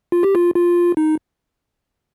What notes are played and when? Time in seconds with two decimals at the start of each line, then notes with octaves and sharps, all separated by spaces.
0.12 F4
0.23 G4
0.35 F4
0.55 F4
0.97 D#4